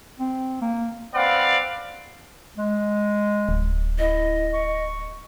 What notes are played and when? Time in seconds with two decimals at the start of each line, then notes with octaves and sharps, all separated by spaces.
0.20 C4
0.62 A#3
1.15 C4 B4 D5 F5 F#5
2.57 G#3
3.49 D1
3.99 E4 D#5
4.54 C#6